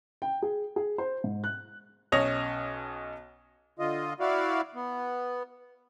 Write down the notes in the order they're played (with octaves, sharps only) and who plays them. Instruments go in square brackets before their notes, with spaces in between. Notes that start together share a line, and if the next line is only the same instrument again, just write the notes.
[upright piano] G5
G#4
G#4
C5
G#2
F#6
[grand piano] B1 C#4 C#5 D#5 A#6 F7
[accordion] D3 F4 D#5
E4 F#4 D5 F5
B3